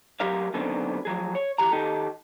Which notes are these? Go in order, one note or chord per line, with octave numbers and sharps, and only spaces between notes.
F#3 G4 A#4 E5 F5
F#2 B2 D3 D#3 B3 C4
F3 F#3 G#4
C#5
E3 G4 A#5
D#3 D#4 G4 A4